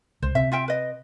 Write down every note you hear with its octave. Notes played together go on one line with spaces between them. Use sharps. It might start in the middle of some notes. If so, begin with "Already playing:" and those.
C#2 C5
C3 E5
F4 E5 G5
B4 D#5